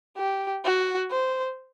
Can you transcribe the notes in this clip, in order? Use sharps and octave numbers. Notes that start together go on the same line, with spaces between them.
G4
F#4
C5